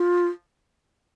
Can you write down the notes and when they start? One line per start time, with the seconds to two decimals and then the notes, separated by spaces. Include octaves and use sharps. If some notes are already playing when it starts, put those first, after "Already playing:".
Already playing: F4